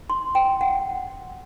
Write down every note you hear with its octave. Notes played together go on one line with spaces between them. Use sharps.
C6
G5
F#5